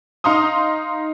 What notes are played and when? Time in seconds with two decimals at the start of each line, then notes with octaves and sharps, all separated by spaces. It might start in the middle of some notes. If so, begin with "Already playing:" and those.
0.24 D#4 F5 A#5 C6 D#6